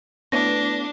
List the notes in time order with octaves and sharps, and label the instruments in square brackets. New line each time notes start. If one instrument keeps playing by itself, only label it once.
[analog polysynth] A3 B3 E4 [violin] D4 [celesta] A#6